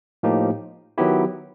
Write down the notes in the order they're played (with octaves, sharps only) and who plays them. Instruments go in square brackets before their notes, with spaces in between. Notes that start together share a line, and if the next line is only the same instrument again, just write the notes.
[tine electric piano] A2 F3 A#3 D#4 G4
D#3 F#3 B3 E4 G4